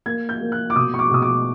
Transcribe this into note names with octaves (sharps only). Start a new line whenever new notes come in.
A#3 G#6
G6
A#3
F#6
D6
B2 D#6
C#6
D6
B2 D#6
D6